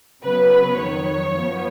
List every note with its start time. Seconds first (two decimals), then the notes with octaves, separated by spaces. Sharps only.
0.23 C#3 F#3 B3 B4
0.78 F2 D#3 F#3 C#5
1.33 F#2 F3 B3